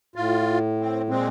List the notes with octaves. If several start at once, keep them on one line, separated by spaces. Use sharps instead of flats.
A2 F4
C4
A#2 G#3 C4